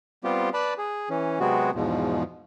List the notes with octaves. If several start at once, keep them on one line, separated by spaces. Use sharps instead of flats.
G3 B3 C4 F4 G4
B4 D5 A5 B5
G#4
E3 C#4
C3 F#3 G#3 B3 C4 F#4
E2 G#2 B2 F3